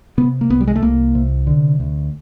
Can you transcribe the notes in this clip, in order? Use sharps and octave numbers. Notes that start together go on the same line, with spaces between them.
C3 B3
A#3
C2 B3
G3
G#3
A3
C2 A#3
C3
D3
D2